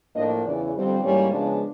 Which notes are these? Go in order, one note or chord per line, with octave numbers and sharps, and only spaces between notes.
A2 F3 A#3 D4 D#5
E2 C#3 E3 D5
F2 D3 G3 C4
G#2 E3 G3 A#3 C#4 C#5
C#3 F3 G#3 B3 D4